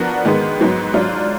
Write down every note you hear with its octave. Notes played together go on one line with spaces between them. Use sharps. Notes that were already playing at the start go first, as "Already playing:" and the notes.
Already playing: F3 B3 D4 F#4 A#4
G#2 D#3 G#3 B3
G#2 F#3 B3
G#2 F#3 D4 F4